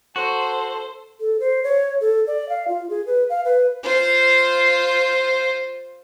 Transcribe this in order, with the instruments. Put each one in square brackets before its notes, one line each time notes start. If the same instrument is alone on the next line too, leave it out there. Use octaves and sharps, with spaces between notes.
[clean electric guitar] F#4 [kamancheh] A4 [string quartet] C5
[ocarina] A4
C5
C#5
A4
D5
F5
F4
G#4
B4
F5
B4
[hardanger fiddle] F4 C5